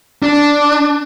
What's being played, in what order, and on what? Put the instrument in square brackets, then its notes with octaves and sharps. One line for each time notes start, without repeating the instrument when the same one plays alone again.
[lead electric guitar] D4